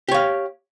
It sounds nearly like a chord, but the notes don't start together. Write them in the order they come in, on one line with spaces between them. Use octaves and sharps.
G4 C#5 F5